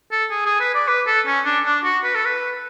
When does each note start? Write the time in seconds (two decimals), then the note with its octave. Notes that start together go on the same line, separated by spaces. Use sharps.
0.12 A4
0.31 G#4
0.46 G#4
0.60 B4
0.74 D5
0.88 B4
1.07 A4
1.27 C#4
1.45 D4
1.66 D4
1.84 F#4
2.04 B4
2.15 A4
2.25 B4